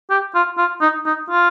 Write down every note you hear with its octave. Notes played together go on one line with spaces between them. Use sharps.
G4
F4
F4
D#4
D#4
F4